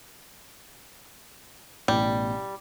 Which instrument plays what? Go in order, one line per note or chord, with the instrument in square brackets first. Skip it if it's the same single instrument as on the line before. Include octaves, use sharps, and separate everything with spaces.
[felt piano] A1 B2 [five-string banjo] G3